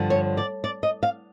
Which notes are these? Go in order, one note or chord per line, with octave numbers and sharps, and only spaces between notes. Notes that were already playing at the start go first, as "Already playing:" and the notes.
Already playing: G2 D3 F3
C#5
D5
D5
D#5
F5